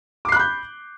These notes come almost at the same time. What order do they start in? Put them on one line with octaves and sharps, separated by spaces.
D6 C7 F#6 B5 G6